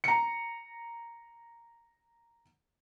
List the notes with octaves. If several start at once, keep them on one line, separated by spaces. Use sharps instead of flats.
A#5 C#7